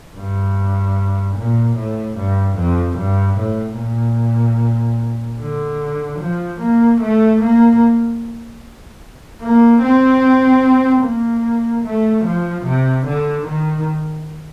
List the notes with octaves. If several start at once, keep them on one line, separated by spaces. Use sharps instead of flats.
G2
A#2
A2
G2
F2
G2
A2
A#2
D3
F3
A#3
A3
A#3
A#3
C4
A#3
A3
F3
C3
D3
D#3